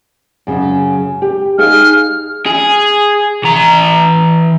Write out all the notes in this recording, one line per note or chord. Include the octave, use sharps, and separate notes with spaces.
F#2 C#3
G4
D#4 G#4 F5 F6
G#4
E3 A#5